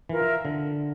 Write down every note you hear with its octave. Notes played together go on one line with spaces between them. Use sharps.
E3 F4 A#4 E5
D3